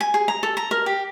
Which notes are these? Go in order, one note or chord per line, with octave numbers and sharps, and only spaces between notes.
G#5
G#4
A#5
A4
A#5
A#4
G4